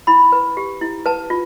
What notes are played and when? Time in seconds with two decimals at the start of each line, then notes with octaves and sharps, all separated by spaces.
0.07 E4 B5
0.32 B4
0.57 G4
0.81 E4
1.06 B4 A5
1.30 F4